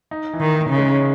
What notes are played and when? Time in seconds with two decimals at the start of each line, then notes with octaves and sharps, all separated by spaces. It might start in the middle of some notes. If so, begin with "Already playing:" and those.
0.11 D#4
0.33 E3
0.41 D#3
0.55 D#4
0.70 C#3
0.78 G#3